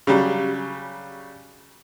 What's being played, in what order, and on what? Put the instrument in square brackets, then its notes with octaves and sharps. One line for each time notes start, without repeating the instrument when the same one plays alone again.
[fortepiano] C#3 F#3 G3